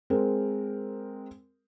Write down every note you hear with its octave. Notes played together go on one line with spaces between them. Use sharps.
G#3 C4 A#4